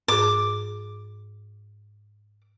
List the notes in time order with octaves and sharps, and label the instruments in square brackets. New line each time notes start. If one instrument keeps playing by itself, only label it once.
[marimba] G#2 G#4 [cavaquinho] D6